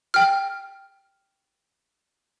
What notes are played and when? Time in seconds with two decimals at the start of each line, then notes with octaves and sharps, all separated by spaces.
0.14 G5 F6